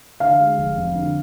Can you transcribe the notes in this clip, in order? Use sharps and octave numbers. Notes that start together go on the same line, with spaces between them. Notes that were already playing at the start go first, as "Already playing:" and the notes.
D3 F5
G#3
F1
F2
D3